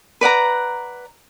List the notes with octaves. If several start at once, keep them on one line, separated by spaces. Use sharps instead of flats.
B4 D5 F#5 A#5